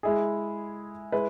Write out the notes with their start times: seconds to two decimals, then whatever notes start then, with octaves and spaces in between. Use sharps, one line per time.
0.03 G#3 E4 G#4
1.12 G#3 E4 B4